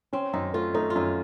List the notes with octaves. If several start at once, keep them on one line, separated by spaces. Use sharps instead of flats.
C4 C#4
F#2 D#4
A3 F4
A3 D#4
F4
F#2 D#4